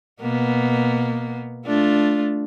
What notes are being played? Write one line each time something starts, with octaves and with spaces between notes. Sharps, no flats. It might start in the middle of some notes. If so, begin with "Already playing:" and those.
B2 A#3 B3
A3 D4 F4